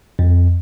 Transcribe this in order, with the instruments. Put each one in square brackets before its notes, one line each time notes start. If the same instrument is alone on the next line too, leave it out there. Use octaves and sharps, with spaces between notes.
[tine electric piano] F2